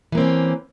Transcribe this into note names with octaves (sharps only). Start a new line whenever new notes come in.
E3 A#3 C4 C#4